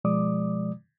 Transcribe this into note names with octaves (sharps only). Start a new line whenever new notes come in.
B2 F3 G#3 D5 D6 D#6